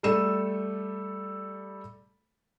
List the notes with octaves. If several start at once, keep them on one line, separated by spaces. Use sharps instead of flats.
G3 A3 A4 D#7 E7